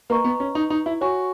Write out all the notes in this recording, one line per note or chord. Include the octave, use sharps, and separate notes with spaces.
A#3 B4 D#5 A#5 C#6
B3
C#4
D#4
D#4
E4
F#4 C#5 G#5 C#6